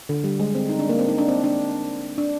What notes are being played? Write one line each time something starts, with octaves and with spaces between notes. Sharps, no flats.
D3
G3
G#3
C4
D#4
D4
A#3
C4
D#4
D4
C4
D4
D4